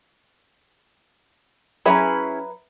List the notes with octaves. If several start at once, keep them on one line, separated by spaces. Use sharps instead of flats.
F#3 C#4 E4 G#4 B4 E5 A#5 B5